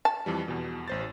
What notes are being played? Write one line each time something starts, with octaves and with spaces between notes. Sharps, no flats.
A5
F2 E3 G3
E2 B2
A1 C5 A6